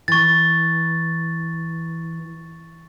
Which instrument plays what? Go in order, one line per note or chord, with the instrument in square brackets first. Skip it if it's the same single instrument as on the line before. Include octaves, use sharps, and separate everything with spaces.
[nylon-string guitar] E3 [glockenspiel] C#6 A6